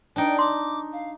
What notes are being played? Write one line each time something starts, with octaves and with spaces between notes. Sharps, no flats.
D4 D#4 G5
C6 D6
F5